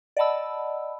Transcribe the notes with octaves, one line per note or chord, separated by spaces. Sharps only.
D5 D#5 F#5 A5 B5 E6